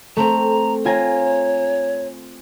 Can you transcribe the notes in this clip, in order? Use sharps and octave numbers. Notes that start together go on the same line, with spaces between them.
A3 C4 A#5
F4 C#5 G#5 A#5